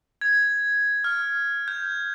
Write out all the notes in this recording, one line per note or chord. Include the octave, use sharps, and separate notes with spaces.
G#6
F6
G6